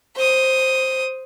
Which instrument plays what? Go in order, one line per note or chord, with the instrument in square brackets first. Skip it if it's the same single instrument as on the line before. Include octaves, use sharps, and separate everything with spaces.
[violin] C5 D#6